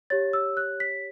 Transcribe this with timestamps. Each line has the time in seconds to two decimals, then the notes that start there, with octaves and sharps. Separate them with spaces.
0.10 G4 C#5 A6
0.33 E6
0.57 F#6
0.80 B6